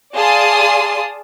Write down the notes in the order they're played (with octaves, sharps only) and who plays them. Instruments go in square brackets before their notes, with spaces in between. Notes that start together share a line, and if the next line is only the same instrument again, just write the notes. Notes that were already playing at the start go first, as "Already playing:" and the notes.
[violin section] G#4 D5 F5 A5 C6 D#6